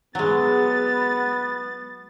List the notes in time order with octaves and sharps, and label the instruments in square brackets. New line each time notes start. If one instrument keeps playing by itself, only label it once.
[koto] F#3 G#3 [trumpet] B3 [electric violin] A6